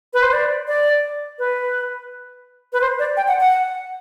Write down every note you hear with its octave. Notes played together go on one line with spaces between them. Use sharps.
B4
C5
D5
D5
B4
B4
C5
D5
G5
F#5
F#5